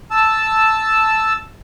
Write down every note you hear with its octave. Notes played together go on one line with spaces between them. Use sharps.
A5 E6